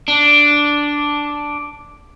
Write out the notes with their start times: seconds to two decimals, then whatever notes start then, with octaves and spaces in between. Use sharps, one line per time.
0.08 D4